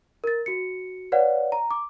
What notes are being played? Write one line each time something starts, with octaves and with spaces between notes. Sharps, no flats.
A#4 A6
F#4 C#7
B4 C#5 D5 F5 F#5
A#5
D6